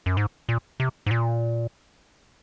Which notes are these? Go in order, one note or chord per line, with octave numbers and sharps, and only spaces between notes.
F#2
G#2
A#2
C3
G#2
A#2